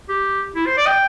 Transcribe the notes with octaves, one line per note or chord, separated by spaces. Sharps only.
G4
E4
C5
D5
G5